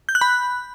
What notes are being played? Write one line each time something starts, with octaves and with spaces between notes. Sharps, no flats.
G6
F#6
B5